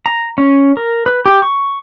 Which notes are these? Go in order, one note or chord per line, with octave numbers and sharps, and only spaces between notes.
A#5
C#4
A#4
B4
G4
C#6